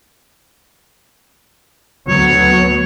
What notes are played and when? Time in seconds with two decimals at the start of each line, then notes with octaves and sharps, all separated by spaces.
2.08 D2 F#3 B3 C#5